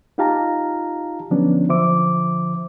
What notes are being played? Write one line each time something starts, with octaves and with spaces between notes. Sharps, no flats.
D#4 F4 G4 F5 A5 A#5
D3 F3 F#3 B3 C#4 D4
D3 F3 C5 E5 D6